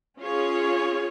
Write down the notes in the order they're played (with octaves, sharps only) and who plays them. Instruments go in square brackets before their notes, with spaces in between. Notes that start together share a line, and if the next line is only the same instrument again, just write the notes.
[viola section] C#4 F4 G#4 C#5